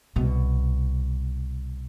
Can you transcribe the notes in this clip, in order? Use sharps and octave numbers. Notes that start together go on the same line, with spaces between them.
C2 B2